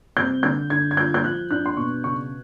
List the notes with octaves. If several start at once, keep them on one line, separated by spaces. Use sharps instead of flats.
C3 G6
D3 G6
D3 G#6
G#6
F4 G6
G6
F3 F#6
D4 F#6
C6
B2 C#6
C#3 C#6